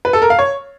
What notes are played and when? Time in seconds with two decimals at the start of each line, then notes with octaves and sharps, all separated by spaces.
0.05 B4
0.13 A4
0.22 A#4
0.30 F5
0.39 C#5